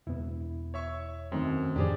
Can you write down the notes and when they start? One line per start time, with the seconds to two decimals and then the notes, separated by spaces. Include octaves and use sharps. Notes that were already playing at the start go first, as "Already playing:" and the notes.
0.07 E1 B3 E4
0.74 C#5 E5 C#6
1.32 F#2 D#3 A3 C4
1.76 F2 A2 D#3 D4 G4 G#4 C5 D5